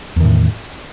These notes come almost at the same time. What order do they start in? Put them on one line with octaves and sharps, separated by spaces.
E2 D#3 A2